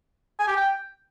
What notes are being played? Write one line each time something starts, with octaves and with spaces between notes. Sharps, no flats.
G#5
G4
G5